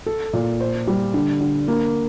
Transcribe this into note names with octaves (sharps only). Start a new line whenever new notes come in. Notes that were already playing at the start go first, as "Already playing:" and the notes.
A4
A#2
C5
G3
D3
D3
A#3